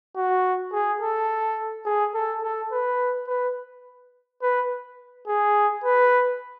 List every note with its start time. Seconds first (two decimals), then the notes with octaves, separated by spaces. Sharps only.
0.16 F#4
0.73 G#4
1.01 A4
1.86 G#4
2.15 A4
2.43 A4
2.72 B4
3.28 B4
4.42 B4
5.28 G#4
5.84 B4